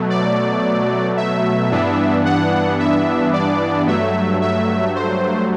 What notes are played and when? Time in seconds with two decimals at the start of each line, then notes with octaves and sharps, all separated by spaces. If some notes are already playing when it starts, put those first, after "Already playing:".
Already playing: B2 F#3 A3
0.10 D5
1.17 E5
1.71 G2 E3 B3 D4
2.25 F#5
2.79 E5
3.33 D5
3.87 G2 F#3 A3 E5
4.42 E5
4.95 C5